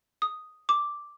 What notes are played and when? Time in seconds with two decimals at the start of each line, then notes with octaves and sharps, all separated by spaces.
0.22 D#6
0.69 D6